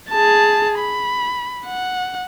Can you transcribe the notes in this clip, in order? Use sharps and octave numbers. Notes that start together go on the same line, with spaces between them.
G#4 A5
B5
F#5